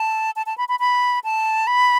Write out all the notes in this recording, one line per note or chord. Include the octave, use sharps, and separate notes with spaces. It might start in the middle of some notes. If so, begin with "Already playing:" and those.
Already playing: A5
A5
A5
B5
B5
B5
A5
B5